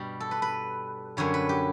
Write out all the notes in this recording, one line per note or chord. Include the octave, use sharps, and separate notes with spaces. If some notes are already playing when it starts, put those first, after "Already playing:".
Already playing: G2 B2 G3 D4 G4
A4
B4
B4
F#2 D3 G3 C#5
B4
G4